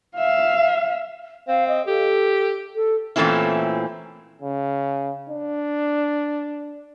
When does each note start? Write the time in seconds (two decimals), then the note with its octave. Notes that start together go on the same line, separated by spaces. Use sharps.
0.16 E5 F5
1.48 C4 F5
1.68 D#5
1.87 G4 A4
2.76 A4
3.16 A#2 E3 A3 C4 C#4 E4
4.42 C#3
5.29 D4